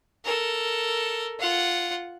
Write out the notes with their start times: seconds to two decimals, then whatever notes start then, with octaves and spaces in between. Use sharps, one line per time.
0.25 A4 A#4
1.39 F4 F#5